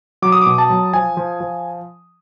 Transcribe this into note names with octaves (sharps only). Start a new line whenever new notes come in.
F#3 D6
D#6
B2 D6
A5
F#3
F3 G#5
F3
F3